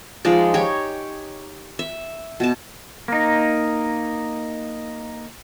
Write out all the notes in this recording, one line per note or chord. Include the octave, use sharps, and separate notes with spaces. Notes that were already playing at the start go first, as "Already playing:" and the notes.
F3 G#3 D#4 D5
G4 C#5
E5
B2 A5
A#3 D#4